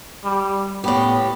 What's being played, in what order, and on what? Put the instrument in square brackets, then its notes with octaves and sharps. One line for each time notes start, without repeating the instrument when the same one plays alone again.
[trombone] G3
[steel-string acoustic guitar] A2 G4 [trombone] B3